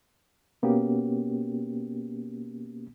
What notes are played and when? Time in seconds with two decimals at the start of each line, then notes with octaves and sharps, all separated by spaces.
0.63 B2 A#3 B3 C#4 F#4 G4